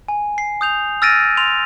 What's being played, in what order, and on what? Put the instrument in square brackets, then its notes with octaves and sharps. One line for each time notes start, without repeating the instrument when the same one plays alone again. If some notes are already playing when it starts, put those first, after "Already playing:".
[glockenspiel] G#5
C7
D#6 G6 F7
E6 F6 A6 A#6 D7 D#7
C6 F7